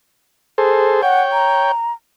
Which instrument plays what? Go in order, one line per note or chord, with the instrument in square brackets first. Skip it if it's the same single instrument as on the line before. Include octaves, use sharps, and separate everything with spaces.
[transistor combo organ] G#4 A4 C5
[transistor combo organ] C#5 G5 [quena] F#5
[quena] A#5